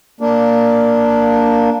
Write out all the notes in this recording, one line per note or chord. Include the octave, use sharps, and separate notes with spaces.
A#3 D4